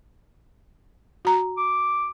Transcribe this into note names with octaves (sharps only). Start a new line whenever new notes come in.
F#4 A#5
D6